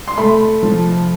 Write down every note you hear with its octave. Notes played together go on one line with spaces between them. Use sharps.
C6
A3 B5
F3